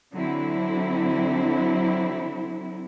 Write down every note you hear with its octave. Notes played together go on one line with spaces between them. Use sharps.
D3 F#3 C4 E4